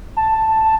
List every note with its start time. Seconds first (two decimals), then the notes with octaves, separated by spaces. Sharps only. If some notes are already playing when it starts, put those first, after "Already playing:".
0.17 A5